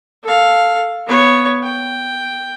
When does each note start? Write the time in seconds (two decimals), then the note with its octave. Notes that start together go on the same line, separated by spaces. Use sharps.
0.23 A4 F5
1.06 B3 C#5
1.63 G5